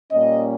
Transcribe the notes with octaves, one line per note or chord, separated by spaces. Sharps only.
A#2 G3 A#3 C#4 D#5